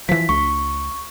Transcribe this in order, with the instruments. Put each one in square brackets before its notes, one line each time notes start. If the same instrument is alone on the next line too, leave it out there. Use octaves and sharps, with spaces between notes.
[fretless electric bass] E3 F3 [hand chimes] B6
[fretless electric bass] C#2 [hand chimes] C#6